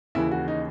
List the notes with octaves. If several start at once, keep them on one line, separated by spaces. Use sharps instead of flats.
D#2 C#3 E3 E4
F#4
D#4